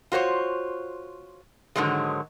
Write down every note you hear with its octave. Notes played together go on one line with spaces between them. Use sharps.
F4 F#4 C5 C#5
G#2 D3 D#3 F#3 G#3